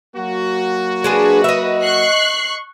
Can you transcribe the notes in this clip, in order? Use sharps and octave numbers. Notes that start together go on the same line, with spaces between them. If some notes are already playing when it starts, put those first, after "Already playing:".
F#3 A#3 F#4
G#3 D4 G#4 B4
D#5 E5
C#6 F#6 C7